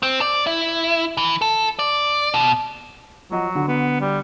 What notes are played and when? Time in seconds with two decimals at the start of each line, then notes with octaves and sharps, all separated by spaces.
0.03 C4
0.21 D5
0.47 E4
1.17 E3
1.42 A4
1.79 D5
2.34 B2
3.31 F3 F#3 D#5 F#5
3.55 D3 F#4
3.68 B3
4.01 G3